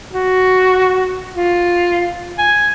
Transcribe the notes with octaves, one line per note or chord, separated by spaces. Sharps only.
F#4
F4
G#5